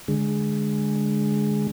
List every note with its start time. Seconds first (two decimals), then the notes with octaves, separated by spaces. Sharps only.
0.08 D3 G#3